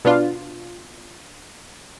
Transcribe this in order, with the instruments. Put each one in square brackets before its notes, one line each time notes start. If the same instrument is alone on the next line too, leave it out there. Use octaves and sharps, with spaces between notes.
[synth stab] B2 B3 D4 F4